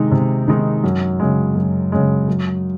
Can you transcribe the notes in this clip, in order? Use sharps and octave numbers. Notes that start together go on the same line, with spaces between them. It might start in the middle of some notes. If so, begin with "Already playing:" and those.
Already playing: C3 D#3 G#3 D#4
C3
D#3 G#3 D#4
F#2
C#3 G#3
F#2
C#3 G#3
F#2